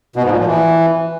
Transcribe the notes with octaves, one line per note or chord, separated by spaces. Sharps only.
B2
G#2
A#2
F3
E3